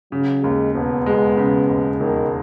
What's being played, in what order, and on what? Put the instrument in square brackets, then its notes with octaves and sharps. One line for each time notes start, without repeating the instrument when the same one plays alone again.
[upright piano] C#3 [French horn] F#3
[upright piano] D#2 [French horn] G#3
[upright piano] E1 [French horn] B3
[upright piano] G#3 [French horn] B3
[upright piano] C#3
D#2
[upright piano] E1 [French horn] D#3